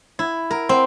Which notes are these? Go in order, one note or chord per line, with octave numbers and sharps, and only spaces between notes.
E4
A#4
C4